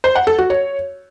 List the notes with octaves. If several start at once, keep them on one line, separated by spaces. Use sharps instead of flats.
C5
F#5
A4
F#4
C#5